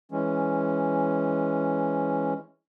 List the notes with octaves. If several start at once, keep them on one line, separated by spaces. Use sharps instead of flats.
E3 G#3 C#4